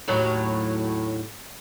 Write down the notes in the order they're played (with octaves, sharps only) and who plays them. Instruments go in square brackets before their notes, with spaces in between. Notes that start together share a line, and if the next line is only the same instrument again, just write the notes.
[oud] D#2 A2 F#3